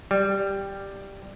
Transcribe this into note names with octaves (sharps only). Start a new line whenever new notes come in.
G3